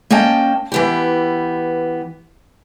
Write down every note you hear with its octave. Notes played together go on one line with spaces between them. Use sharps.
A#3 C#4 D#5 G5 A5
E3 B3 G4